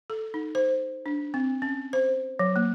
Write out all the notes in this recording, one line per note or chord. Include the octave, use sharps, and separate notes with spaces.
A4
D#4
C5
D4
C4
C#4
C5
F#3
A#3